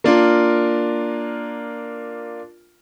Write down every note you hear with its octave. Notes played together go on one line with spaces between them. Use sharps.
A#3 D4 F4 A#4